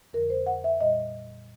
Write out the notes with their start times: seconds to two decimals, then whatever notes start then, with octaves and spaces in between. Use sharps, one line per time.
0.13 F2 D3 F3 A#4
0.30 C5
0.46 F#5
0.64 E5
0.81 A#2 G3 D#5